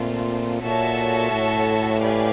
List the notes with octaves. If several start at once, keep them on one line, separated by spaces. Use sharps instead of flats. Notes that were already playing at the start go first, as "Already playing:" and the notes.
Already playing: A#2 A3 C4 F4
A#2 F#4 A4 C#5 E5 A5
A2
G4 B4 D5 F5 G#5